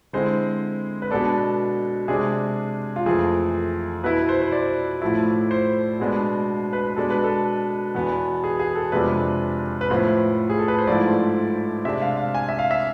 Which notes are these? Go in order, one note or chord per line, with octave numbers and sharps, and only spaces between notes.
D3 G#3 C4 E4 C5
B4
B2 G#3 B3 D4 A4
C3 G#3 D4 G#4
F4
F2 E3 A3 G#4
B2 B3 E4 B4
C5
C5
D5
A2 F3 A3 E4
C5
B2 G#3 B3 D4
B4
B2 G#3 D4 A4
B4
A4
E2 B2 B3
G#4
G#4
A4
F2 C3 G#3 B3 D4 B4
B4
A2 F3 B3 C5
G#4
A4
B4
C5
G#2 F3 A3 E4 D5
C3 G#3 D4 E5
F5
F5
G#5
E5
F5
E5